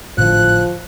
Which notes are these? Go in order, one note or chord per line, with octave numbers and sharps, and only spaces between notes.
G#1 A2 D3 F3 F#6